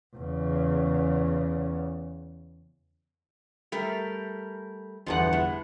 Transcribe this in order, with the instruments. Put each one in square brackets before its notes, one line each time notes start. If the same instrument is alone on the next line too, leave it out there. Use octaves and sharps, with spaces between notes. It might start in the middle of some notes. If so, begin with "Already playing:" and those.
[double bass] E2 C#3
[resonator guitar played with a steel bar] G3 A3 A#4
[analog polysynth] G1 E2 F#5 [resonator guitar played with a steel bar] G2 A#2 F3
[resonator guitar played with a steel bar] A2